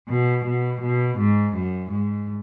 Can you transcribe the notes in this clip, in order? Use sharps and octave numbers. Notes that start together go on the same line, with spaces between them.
B2
B2
B2
G#2
F#2
G#2